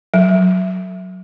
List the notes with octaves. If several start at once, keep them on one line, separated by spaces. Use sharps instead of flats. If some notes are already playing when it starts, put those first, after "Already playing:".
F#3